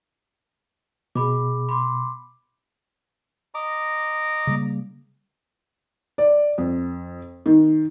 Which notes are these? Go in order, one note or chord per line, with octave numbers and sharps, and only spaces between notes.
B2 G#4 B5 D6
B5 C6 D6
D#5 A#5 D6
C#3 G3 A#3
D5
F2
D#3